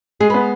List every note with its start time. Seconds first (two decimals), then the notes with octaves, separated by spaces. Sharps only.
0.20 G#3 G#4
0.30 B3 B4